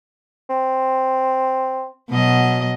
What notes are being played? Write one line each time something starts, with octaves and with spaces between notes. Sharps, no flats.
C4
B2 F#3 D#5